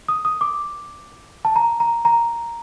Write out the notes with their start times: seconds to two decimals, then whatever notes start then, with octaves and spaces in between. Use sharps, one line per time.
0.09 D#6
0.25 D#6
0.41 D6
1.45 A5
1.56 A#5
1.80 A#5
2.05 A#5